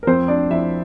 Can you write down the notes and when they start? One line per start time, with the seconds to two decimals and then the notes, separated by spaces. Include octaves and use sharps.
0.03 A#4
0.07 F2 C4 C5
0.28 D4 D5
0.50 F2 E4 E5